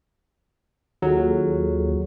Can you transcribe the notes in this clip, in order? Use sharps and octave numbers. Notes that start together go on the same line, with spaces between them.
D#2 F#3 F4 G#4 A4